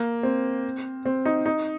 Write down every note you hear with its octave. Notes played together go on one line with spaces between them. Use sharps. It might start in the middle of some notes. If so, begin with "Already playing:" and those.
Already playing: A#3
C4
C4
D#4
D#4